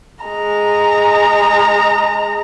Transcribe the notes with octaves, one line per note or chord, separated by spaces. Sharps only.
G#3 A#5